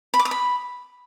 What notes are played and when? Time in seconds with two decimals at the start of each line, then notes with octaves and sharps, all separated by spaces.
0.14 B5
0.19 D6
0.25 D#6
0.31 B5